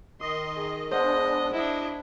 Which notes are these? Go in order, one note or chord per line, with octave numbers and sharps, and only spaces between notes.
D#3 D#5 C6 D#6
G#4
G#3 B3 D4 C5 D#5 F5 F#5
D4 E4 D#5